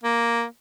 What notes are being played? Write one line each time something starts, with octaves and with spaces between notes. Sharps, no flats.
A#3